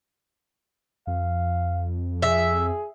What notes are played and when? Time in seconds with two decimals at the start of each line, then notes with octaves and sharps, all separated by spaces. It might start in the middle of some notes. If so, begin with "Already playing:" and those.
1.07 F2 F5
2.22 G#4 E5